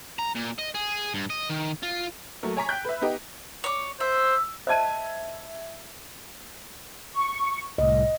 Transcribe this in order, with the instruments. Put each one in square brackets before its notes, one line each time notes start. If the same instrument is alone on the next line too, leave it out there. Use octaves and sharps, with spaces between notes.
[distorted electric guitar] A#5
A#2
D#5
G#4
G2
D#5
D#3
F4
[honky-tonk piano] F#3 A3 A#3
C#5 G#5 A#5 C#6 B6
G5 F#6 G6
B4 E5
B3 D#4 G4
[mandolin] C#5 D6
[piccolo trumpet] C5 [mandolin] E5
[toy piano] C5 D#5 A5 [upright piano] E5 G#6 D#7
[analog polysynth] C#6
[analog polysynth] C2 A2 [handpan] D#5